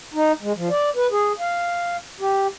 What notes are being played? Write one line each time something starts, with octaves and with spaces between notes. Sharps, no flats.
D#4
G#3
F3
D5
B4
G#4
F5
G4